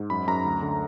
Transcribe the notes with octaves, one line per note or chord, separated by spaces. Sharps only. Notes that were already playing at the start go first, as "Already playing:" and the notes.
Already playing: G#2
F#2 B5
F#2 A#5
D2
D3